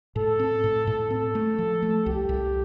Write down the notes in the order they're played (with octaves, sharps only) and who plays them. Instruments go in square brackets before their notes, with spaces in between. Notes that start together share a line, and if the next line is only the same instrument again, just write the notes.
[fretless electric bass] A2 [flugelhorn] A4
[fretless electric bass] C4
A2
A2
[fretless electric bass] C4 [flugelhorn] A4
[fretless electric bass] A3
F3
A3
[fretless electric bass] C2 [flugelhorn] G4
[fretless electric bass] C2